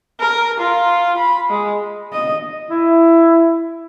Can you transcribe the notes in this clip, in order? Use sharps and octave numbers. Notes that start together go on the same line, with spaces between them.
A#4
F4
B5
G#3
D#5
E4